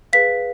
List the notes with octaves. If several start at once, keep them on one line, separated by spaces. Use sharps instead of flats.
G#4 B4 F5 B6